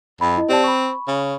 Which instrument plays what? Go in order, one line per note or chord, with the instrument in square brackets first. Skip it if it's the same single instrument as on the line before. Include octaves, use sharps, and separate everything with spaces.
[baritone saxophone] F2 [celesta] B5
[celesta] E4 D#5
[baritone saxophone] C4 [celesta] G4 D5 A5
[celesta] B5 C#6
[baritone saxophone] C#3